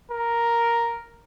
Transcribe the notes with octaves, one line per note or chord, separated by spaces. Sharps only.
A#4